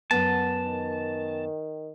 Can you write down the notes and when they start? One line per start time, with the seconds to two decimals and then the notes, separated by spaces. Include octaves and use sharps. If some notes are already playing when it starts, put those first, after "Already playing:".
0.11 F#2 B3 A5
0.65 D#3